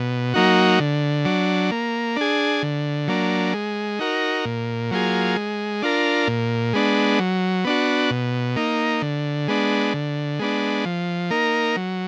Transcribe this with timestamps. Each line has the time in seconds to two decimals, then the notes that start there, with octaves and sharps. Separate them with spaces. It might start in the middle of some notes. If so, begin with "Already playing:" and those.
Already playing: B2
0.34 F#3 A#3 D#4 F#4
0.80 D3
1.25 F#3 D4
1.71 A#3
2.16 D4 G#4
2.63 D3
3.08 F#3 A#3 D4
3.54 G#3
3.99 D#4 F#4 A#4
4.45 A#2
4.91 F#3 A#3 F4 G#4
5.37 G#3
5.82 D4 F4 A#4
6.28 A#2
6.73 G#3 B3 D4
7.19 F#3
7.65 B3 D4 F#4
8.11 B2
8.56 A#3 D#4
9.02 D3
9.48 G#3 B3 D4
9.94 D3
10.39 G#3 B3 D4
10.85 F3
11.30 A#3 D#4 A#4
11.76 F#3